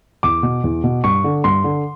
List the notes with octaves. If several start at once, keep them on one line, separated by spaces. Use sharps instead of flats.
E2 D6
B2
E2
B2
G2 C#6
D3
G2 C6
D3